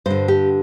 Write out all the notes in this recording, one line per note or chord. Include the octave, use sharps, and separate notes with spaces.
G2 D3 C5
G4